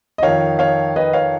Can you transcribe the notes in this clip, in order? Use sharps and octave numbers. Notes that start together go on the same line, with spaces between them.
D#5
F2 D#3 C#5 F5
C#5 F5
B4 D#5
C#5 F5